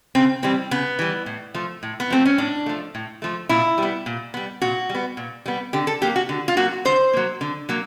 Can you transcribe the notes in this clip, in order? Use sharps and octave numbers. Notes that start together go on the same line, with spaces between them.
C#3 C4
E3 G3 C4
C#3 B3
E3 G3
A2
F3 A3
A2
B3
F3 A3 C4
C#4
A2 D4
F3 A3
A2
F3 A3
A#2 E4
G3 B3
A#2
G3 B3
A#2 F#4
G3 B3
A#2
G3 B3
D3 G4
A4
F#3 A#3 G4
F#4
D3
F4
F#3 A#3 F#4
D3 C5
F#3 A#3
D3
F#3 A#3